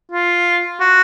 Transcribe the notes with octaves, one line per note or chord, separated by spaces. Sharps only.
F4
F#4